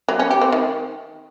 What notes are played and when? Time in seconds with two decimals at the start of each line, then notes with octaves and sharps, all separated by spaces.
0.09 F#3
0.19 C#4
0.30 G4
0.41 C4
0.52 D#3